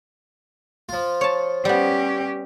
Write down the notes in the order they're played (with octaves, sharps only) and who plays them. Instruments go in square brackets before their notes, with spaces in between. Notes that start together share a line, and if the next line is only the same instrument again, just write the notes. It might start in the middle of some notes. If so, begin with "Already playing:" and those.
[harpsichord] F3 F4
[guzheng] C#5 A5
[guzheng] G3 B3 [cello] C#4 G4